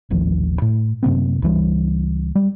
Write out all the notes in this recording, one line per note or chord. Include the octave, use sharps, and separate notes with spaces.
D#1 A1 D#2 F3
A2
F#2 C3 A#3 C4
C#2 E3 G3
G3